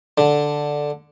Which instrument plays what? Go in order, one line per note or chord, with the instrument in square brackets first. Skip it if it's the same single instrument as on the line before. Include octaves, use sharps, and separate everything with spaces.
[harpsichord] D3